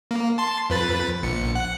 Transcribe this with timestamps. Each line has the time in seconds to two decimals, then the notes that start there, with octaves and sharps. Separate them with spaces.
0.11 A#3
0.38 A5 C6
0.70 F2 B4 A6
1.23 A#1 C#7
1.55 F#5